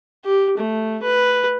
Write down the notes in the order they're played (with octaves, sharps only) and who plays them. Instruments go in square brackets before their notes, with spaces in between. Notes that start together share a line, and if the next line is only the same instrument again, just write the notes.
[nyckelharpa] G4
A3
B4